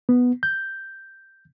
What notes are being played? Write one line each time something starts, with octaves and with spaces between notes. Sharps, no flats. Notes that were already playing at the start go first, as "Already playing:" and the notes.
B3
G6